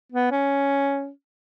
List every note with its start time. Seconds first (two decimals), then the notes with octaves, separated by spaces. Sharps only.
0.12 B3
0.31 C#4